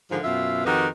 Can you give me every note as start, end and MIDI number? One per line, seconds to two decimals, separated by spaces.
0.10 0.19 44
0.10 0.19 50
0.10 0.19 51
0.10 0.19 53
0.24 0.63 42
0.24 0.63 47
0.24 0.63 65
0.24 0.63 76
0.65 0.87 41
0.65 0.87 51
0.65 0.87 66
0.65 0.87 67
0.65 0.87 71
0.65 0.87 75